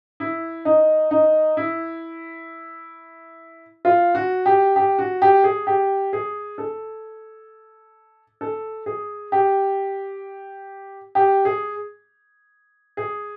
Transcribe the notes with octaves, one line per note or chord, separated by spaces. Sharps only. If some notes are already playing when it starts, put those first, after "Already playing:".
E4
D#4
D#4
E4
F4
F#4
G4
G4
F#4
G4
G#4
G4
G#4
A4
A4
G#4
G4
G4
G#4
G#4